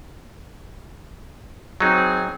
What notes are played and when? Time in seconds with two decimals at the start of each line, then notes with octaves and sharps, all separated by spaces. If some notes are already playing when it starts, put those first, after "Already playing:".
1.80 F#3 C4 D#4 G#4